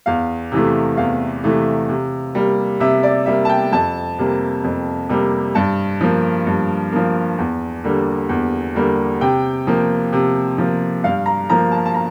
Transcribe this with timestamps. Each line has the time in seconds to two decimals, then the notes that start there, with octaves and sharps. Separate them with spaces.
0.06 E2 F5
0.52 C3 E3 A3
0.97 E2 F5
1.44 C3 E3 A3
1.89 C3
2.35 G3 A#3
2.80 C3 E5
3.03 D5
3.26 G3 A#3 E5
3.45 A5
3.49 G5
3.72 F2 A5
4.18 C3 G3 A#3
4.64 F2
5.09 C3 G3 A#3
5.55 G2 A5
6.01 F3 A#3
6.47 G2
6.92 F3 A#3
7.38 E2
7.84 D3 G3 A#3
8.29 E2
8.75 D3 G3 A#3
9.21 C3 G5
9.67 F3 A#3
10.13 C3
10.58 F3 A#3
11.04 G2 F5
11.26 A#5
11.50 F3 A#3 A#5
11.71 A5
11.85 A5
11.94 A#5